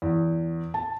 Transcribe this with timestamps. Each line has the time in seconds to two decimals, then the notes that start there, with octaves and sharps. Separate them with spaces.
0.02 E2
0.74 A5